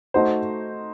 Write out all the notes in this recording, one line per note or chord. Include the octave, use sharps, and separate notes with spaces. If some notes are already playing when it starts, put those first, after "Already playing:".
A3 D#4 F#4 C5